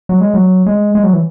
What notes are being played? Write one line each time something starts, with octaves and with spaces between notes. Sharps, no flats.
F#3
G#3
F#3
G#3
G#3
F#3
E3